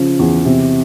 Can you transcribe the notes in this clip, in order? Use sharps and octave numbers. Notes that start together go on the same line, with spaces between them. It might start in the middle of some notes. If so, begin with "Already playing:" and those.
Already playing: C#3 F3
E2
C3